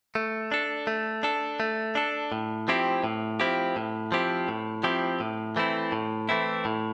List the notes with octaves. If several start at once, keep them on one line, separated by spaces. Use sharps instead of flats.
A3
D4 A4
A3
D4 A4
A3
D4 A4
A2
F3 C4 E4 G4
A2
F3 C4 E4 G4
A2
F3 C4 E4 G4
A2
F3 C4 E4 G4
A2
E3 A3 C4 E4
A2
E3 A3 C4 E4
A2